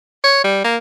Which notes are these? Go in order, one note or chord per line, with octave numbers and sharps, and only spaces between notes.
C#5
G3
A#3